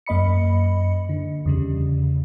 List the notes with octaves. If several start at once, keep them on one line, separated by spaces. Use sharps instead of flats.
F#2 A#3 D#5 B5 C#7
D3
E2 C#3 G3